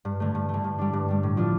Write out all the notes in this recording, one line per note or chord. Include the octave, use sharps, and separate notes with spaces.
G2
D3 A3
G2
A3
D3
G2
G3 D4
G2
G3 D4
A2
F3 D4 F4